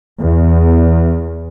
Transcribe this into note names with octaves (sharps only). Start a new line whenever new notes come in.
E2